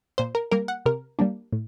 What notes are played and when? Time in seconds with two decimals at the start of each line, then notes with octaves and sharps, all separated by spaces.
0.18 A#2 C5
0.35 A#4
0.51 G3 A#3 A#4
0.68 F#5
0.86 C3 A#4
1.19 G3 A#3 D4
1.53 A2